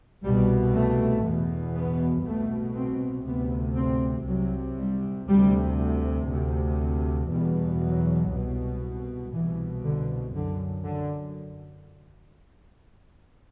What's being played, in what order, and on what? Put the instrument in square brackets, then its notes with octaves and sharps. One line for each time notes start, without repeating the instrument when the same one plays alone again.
[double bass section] C2 B2 G3
A3
E2 B2
B3
C2 B2 A3
C4
D2 C3 B3
C4
C2 C3 F#3
G3
D2 C3 G3
D2 C3
E2 B2 G3
F#3
C2 B2
C2 B2 E3
D3
F#2 D3
D3